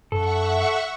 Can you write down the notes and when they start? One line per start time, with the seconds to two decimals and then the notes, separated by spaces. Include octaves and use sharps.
0.12 F#2 A4 E5 F#5 C#6